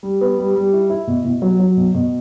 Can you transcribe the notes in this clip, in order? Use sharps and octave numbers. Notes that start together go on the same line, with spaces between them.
G3
B3
G3
G3
E4
E4
B2
B2
F#3
F#3
B2
B2